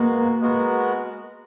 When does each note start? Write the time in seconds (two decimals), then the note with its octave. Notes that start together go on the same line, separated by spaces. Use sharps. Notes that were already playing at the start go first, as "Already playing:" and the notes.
Already playing: G#3 A#3 B3 F#4 A#4
0.41 G#3 B3 F#4 A#4